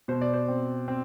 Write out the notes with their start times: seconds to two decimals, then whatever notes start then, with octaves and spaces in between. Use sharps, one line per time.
0.08 B2 C5
0.21 D5
0.33 C5
0.48 C4
0.88 C4